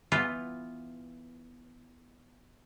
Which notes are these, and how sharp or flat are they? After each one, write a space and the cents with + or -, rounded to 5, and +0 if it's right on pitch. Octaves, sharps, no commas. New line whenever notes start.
E3 +0 B3 +0 F4 +0